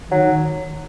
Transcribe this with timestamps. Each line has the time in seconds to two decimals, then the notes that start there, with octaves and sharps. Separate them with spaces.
0.11 D#3 F#3